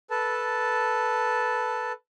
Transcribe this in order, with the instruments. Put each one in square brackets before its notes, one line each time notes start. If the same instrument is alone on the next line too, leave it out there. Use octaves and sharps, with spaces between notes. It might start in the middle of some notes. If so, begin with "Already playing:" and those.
[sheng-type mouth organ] A4 B4 A5